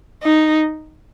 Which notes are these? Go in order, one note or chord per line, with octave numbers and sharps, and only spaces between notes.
D#4